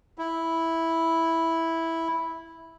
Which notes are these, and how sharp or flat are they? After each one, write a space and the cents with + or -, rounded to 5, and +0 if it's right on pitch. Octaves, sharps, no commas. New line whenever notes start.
E4 -5